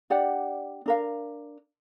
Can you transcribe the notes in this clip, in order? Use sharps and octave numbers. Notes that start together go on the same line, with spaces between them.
D4 G4 D5 F#5
D4 A#4 F5